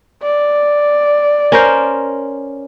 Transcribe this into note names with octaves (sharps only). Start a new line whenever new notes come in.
D5
C#4 A#4 C5